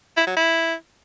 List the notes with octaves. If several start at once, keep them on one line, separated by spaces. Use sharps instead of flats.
E4
F#3
E4